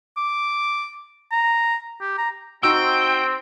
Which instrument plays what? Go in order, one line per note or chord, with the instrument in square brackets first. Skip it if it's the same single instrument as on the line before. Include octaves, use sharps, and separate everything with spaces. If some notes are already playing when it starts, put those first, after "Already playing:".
[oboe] D6
A#5
G4
A#5
[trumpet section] C4 [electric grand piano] D#4 F#4 E6 [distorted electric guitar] G5